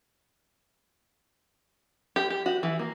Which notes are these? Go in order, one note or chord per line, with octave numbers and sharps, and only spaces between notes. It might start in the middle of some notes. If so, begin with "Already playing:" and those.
G4
G4
F#4
E3
A#3